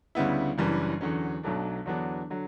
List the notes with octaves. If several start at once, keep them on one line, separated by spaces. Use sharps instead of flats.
D2 C#3 G3 B3 E4
F#1 F#2 E3 G3 D4
E2 D3 F#3 C#4
B1 B2 F#3 A3 D4
E2 D3 F#3 B3 D4
D3 F#3